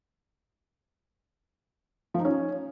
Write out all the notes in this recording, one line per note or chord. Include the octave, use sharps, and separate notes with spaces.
F3
D#4
C#4